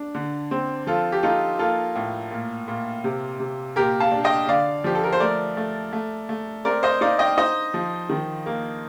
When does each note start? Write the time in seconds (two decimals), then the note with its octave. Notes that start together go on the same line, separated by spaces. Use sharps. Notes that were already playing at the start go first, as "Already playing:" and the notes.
Already playing: D4
0.15 D3
0.51 C4
0.87 F3 F4 A4
1.12 G4
1.23 D#4 F4 A4
1.59 A#3 F4 A4
1.95 A2
2.31 A#2
2.68 A#2
3.04 C3
3.40 C3
3.76 A#2 G4 A#4
4.00 F5 A5
4.12 D4
4.24 D#5 G5
4.49 D3 D5 F5
4.84 F3 G4
4.95 A4
5.04 A#4
5.13 C5
5.20 A3 A#4 D5
5.57 A3
5.93 A3
6.29 A3
6.65 C4 A#4 D5
6.83 C5 D#5
7.01 D#4 D5 F5
7.19 D#5 G5
7.37 D#4 C5 D#5
7.74 F3
8.10 D#3
8.46 A#3